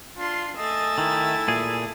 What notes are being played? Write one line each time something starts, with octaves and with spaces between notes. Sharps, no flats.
D4 F4 C6
A3 D#5 G#5 E6 A6
D#3 E4
A#2 G#4